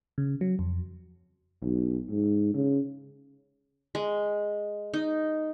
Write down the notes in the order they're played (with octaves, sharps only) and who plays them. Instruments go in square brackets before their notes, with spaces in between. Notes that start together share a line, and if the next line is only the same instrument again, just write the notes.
[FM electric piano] C#3
F#3
F2
[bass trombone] B1
G#2
C#3
[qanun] G#3
D#4